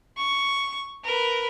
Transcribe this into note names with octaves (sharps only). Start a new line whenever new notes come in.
C#6
A#4 B4